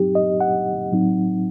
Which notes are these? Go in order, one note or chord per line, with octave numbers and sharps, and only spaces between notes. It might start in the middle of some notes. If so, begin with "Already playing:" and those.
Already playing: G2 F#3 C4 D#4 G4
D#5
F#5
A2 F#3 C4 D#4